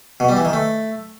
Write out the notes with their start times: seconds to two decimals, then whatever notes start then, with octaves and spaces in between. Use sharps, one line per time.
0.20 B2
0.28 G3
0.37 E3
0.45 D#3
0.53 A3